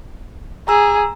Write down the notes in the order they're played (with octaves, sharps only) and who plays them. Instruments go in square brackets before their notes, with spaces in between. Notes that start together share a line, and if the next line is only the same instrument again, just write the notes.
[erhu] G#4 [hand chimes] A#5 E6